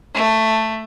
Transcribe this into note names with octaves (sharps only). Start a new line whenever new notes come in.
A3